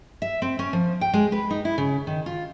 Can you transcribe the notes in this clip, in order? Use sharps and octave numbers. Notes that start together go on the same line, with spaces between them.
E5
C4
C#4
F3
G5
G#3
B4
D#4
E4
C#3
D#3
F4